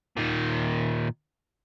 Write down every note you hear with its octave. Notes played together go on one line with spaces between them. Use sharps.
A#2 D#3